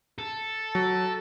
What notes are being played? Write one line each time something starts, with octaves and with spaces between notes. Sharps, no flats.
A4
F#3